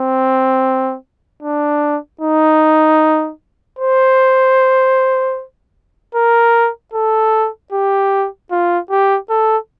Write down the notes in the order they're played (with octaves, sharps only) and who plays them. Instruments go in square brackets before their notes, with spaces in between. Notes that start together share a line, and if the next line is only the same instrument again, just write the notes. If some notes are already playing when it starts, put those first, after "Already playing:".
Already playing: [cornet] C4
D4
D#4
C5
A#4
A4
G4
F4
G4
A4